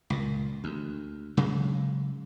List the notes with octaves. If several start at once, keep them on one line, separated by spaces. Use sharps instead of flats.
C#2 A#2
D2
C#3 F#3 G#3